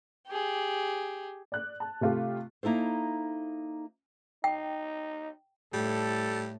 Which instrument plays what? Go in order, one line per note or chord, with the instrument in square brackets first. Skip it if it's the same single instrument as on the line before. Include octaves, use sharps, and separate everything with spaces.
[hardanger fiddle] G4 G#4
[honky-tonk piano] D5 F#6
A5
C3 A3 F4 G4
[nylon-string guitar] A#3 D#4 E4 A4 C5
[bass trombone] D#4 [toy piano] G5
[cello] A2 [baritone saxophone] G3 [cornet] A4